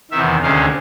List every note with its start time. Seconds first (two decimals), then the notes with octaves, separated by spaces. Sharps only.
0.11 E2 C3 D#3 E5
0.42 D2 C3 D#3 G#3 C#4 F5